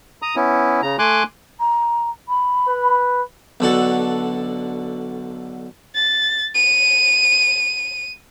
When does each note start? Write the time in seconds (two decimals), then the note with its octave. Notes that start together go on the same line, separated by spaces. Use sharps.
0.22 A#5 D#6
0.36 B3 C#4 E4
0.82 C#3 A#5
0.99 A3 G#5 C6 D6 F#6
1.60 A#5
2.28 B5
2.68 B4
3.60 B1 D3 F#4 A4
5.95 A6
6.54 D#7